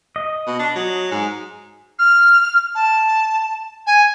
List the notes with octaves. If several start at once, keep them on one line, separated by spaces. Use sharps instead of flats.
D#5
B2
D4
F#3
G#2
F6
A5
G#5